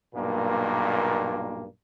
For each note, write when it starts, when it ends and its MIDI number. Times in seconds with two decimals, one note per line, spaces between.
0.14 1.65 35
0.14 1.65 43
0.14 1.65 46
0.14 1.65 58